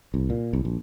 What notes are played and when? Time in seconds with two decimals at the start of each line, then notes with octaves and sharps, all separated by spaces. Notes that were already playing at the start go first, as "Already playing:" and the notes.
0.14 C2
0.30 A#2
0.53 C2
0.65 A#1